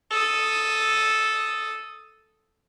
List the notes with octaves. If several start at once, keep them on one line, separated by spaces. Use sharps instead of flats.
A4 D#6